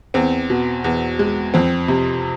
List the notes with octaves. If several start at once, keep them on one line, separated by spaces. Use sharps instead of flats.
E2 C4
B2
E2
G#3
F2 C4
C3